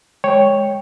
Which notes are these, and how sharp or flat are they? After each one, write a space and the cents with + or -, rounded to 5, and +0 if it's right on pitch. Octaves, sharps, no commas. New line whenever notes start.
G#3 +0 C#5 +0 G5 +0